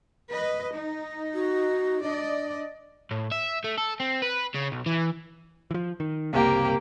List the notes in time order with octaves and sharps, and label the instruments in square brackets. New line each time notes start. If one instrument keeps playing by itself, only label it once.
[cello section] B4 D#5
D#4
[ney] F#4
[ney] D4 [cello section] D5 D#5
[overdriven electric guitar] A2
E5
A3
A4
C4
B4
C#3
B1
E3
[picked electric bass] E3 F3
D#3
[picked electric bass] F#1 C2 C3 [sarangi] A#3 [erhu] G4